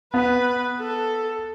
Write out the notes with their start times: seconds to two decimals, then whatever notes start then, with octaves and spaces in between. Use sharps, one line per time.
0.14 B3 B4
0.81 A4